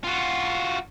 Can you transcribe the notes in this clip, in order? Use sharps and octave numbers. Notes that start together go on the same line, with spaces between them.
F4 F#4